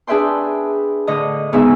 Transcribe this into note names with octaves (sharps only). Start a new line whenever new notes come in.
D4 G#4 B4 E5 G5 C6
A2 D3 D#5
D2 G#2 C#3 B3 E5 G#5